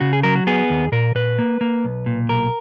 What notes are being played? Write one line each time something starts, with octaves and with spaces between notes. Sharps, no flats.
C#3 F#4
G#4
F#3 A#4
F#4
B3 G#4
D#2
A#2 A#4
A#2 B4
A#3
A#3
B1
A#2
B1 A#4